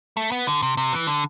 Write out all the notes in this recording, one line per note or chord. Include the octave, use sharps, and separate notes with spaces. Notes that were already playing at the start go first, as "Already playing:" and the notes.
A3
B3
D3
C3
C3
E3
D3